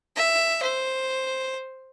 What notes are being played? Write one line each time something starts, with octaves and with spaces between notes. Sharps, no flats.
E5
C5